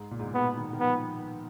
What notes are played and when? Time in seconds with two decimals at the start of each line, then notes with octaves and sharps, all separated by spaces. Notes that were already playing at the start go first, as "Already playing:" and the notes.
Already playing: G#2
0.11 A#2
0.20 G#2
0.27 A#2
0.34 B2 B3
0.57 D#3
0.73 D#3
0.80 F3 B3